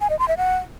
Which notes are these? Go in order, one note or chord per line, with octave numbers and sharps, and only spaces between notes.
G#5
D#5
C6
E5
F#5